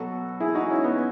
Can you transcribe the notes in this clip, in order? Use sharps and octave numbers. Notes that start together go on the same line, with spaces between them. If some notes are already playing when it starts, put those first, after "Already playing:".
Already playing: B2 F#3 F#4 A4
E4 G#4
D#4 F#4
C#4 E4
B3